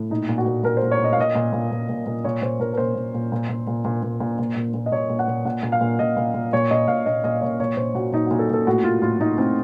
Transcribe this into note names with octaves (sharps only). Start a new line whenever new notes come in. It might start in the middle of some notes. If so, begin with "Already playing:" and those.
Already playing: A2
A#2 D#4
A#2
F#4
A#2
A#2 A#4
C5
A#2
C#5
A#2 D#5
F5
A#2 D#5
A#2
A#2
A#2
A#2
A#2
A#2 C#5
A#2 C5
A#2 A#4
A#4
A#2 C5
A#2
A#2
A#2
A#2
A#2
A#2
A#2
A#2
A#2
A#2
A#2
D#5
A#2 C#5
A#2
F#5
A#2
A#2 F#5
A#2
F5
A#2
A#2 D#5
A#2
A#2
A#2 C#5
A#2 D#5
A#2 F5
A#2 D#5
A#2 D#5
A#2 C#5
A#2 C#5
A#2 C5
A#2 F#4
A#2 D#4
F#4
A#2
A4
A#2 A4
A2 F#4
A2 F4
A2 F4
A2 D#4
A2 C4